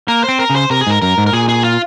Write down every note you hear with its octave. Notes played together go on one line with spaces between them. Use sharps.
A#3 A#4
C4 C5
A#4
C#3
C5
C3 A#4
G#4
G#2 A#4
F#2 A#4
G#2
A#4
A#2 G#4
G#4
F4